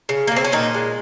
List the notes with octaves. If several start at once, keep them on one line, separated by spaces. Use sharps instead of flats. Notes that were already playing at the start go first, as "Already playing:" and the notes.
C#3
A#3
C#3 C4
C#4
A#2 D#3 D#4
G#3